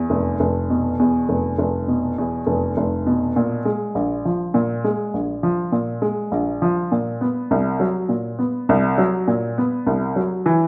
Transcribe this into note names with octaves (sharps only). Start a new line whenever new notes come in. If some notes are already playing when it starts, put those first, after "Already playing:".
Already playing: E2
F1
F1
B2
E2
F1
F1
B2
E2
F1
F1
B2
A#2
G#3
A#1
F3
A#2
G#3
A#1
F3
A#2
G#3
A#1
F3
A#2
B3
C2
F#3
A#2
B3
C2
F#3
A#2
B3
C2
F#3
E3